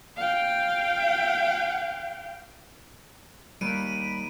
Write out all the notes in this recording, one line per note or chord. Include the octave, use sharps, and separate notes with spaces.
F5 G5
D#2 D#3 G3 B5 D7 D#7